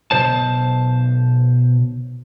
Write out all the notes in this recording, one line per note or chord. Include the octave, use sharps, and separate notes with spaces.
B1 G#2 B2 C5 A5